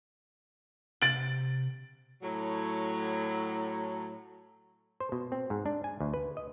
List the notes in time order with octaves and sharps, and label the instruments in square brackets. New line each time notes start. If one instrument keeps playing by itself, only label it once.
[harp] C3 [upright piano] A6 D7 F#7
[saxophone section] A2 F#3
[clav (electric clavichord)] C5
B2
C4
G#2
D4
G#5
D2
B4
D#5